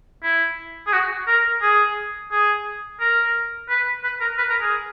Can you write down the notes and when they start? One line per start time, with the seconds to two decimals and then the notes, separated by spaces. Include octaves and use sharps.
0.23 E4
0.87 G#4
0.93 F#4
1.27 A#4
1.62 G#4
2.31 G#4
3.00 A#4
3.69 B4
4.04 B4
4.21 A#4
4.38 B4
4.50 A#4
4.61 G#4